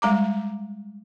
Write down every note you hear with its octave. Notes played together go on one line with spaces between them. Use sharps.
G3 G#3 A#5 D6